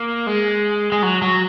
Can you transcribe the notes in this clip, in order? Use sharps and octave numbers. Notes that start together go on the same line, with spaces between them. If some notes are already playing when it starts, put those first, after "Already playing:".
Already playing: A#3
G#3
G#3
F#3
F#3